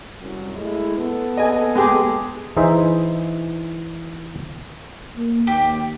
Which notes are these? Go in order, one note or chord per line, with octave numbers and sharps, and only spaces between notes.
C2 F#2
G#3 A3 E4
B3 A4
D#5 G#5
G#3 G4 G#4
E3 D#4 G#4 C5 E5
A#3
D#2 G4